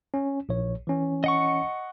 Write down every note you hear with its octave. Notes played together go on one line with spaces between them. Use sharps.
C#4
A#1 C#5
E3 C#4
D#5 F#5 C#6